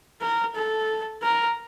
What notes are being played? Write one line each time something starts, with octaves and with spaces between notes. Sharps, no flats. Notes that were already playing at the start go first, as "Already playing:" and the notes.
A#4
A4
A#4